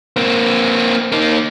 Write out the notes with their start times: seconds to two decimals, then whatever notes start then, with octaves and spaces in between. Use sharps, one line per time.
0.16 A#3 C4
1.12 A#3 D#4